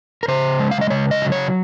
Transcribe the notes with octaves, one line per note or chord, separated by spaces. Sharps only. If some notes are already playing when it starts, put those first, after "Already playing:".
A#4
C#3 C5
G#3
F5
D#5
C#3 C#5
D#5
F#3
C#5